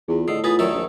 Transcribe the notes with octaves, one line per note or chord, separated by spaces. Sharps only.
E2 F4 G#4
A2 D3 D#5 D#6 C7
B3 F4 G#4 A6 B6
F#2 D#3 F#4 A4 C#5 D5
A#1